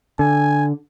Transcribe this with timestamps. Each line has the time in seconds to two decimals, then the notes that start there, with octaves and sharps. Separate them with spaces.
0.19 D3 G#5